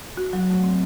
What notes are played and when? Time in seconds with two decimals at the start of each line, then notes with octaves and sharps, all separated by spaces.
0.17 F#4
0.33 F#3
0.49 A3
0.63 C4